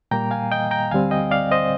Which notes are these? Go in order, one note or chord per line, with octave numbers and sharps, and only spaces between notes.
A#2 G3 A#3 G5 A#5
F5 G#5
D#5 G5
G5 A#5
D2 D3 G3 C4 F5 G#5
D#5 G5
D5 F5
C5 D#5